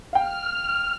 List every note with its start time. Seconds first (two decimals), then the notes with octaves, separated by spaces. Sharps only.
0.13 F5 G5 F6